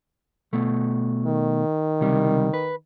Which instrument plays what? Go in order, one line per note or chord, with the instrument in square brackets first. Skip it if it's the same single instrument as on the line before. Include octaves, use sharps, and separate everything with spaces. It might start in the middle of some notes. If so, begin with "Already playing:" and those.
[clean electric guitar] B2 A3
[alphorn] D#3
[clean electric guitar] C#2 C3 G3
B4